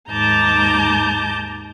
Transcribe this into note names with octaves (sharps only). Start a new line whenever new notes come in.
D#2 G#2 A5 A#5 D6 G6